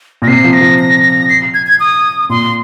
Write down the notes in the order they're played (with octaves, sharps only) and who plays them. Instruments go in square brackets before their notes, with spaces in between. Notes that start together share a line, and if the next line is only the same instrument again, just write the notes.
[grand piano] A#2 [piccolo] A#6
[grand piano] C3 [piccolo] C7
[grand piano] F3
[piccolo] A#6
[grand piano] F3
[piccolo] A#6
A#6
C7
G#6
G#6
D#6
[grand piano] A#2 [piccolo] C6